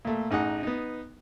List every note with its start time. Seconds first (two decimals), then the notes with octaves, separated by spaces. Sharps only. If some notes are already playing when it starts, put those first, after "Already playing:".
0.05 A#2 A3
0.31 A1 D#4 G#4 F#5
0.63 B3 D#4